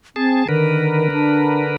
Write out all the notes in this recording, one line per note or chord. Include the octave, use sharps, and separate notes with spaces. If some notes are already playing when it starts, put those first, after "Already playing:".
C4 G#4 A5
D3 D#3 A#4 B4
D4